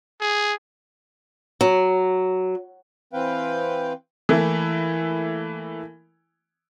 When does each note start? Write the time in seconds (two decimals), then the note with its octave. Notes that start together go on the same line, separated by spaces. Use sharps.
0.21 G#4
1.61 F#3
3.13 E3 C4 B4 F5 G5
4.29 E3 A3 A#3 E4